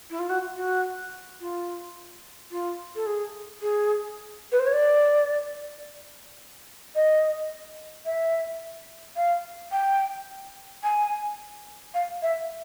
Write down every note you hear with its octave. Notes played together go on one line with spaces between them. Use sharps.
E4
F4
F#4
F#4
F4
F4
A4
G#4
G#4
B4
C5
C#5
D5
D#5
E5
F5
G5
G#5
F5
E5